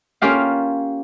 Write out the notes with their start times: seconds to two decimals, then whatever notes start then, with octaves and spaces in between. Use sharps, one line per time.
0.22 A#3 C#4 F4 G4 F5